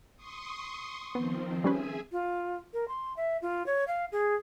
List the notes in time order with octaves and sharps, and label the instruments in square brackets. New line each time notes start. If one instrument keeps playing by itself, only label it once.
[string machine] C6 C#6 D#6
[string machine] D#3 F3 C4 [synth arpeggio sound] B3
[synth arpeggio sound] G3 C#4 B4 [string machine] G#4 E5 G#5
[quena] F4
A#4
C6
E5
F4
C#5
F5
G#4